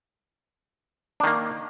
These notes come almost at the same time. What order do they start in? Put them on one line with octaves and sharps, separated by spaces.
D4 D#3 A#3